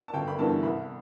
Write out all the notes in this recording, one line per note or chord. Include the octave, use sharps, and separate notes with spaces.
A5
G1 G5
B5
G2 E3 B3 A5
C2 B5